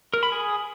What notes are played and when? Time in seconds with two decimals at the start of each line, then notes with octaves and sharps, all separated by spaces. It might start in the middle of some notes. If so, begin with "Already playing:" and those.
0.14 A#4
0.23 B5
0.32 G#4